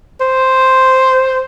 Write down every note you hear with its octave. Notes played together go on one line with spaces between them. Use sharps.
C5